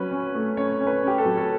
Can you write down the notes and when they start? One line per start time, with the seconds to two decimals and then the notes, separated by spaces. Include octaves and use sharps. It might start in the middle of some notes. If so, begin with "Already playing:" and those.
Already playing: F#3 C#4 B4
0.11 C#4
0.35 A3
0.57 C#4 C#5
0.80 C#4
0.87 B4
1.03 C#4 G4
1.18 A4
1.25 F#3
1.37 A4